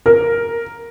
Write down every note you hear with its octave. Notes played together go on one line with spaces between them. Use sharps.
A#4